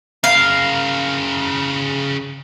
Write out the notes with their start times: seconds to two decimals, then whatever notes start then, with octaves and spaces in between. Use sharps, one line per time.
0.24 C#3 A#4 F5